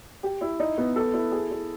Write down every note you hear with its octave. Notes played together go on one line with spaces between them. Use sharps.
G4
E4
D#4
B3
A4
E4
G#4
E4